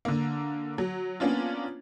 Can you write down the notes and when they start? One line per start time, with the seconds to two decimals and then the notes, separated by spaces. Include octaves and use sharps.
0.05 D3 A#3
0.78 F#3
1.20 A#3 B3 C#4 D4 F4